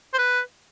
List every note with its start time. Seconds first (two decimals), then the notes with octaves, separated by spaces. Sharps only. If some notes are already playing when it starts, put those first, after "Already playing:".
0.13 C5
0.18 B4